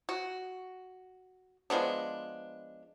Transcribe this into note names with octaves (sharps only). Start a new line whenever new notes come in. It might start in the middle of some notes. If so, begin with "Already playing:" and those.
F#4
F3 G#3 B3 D4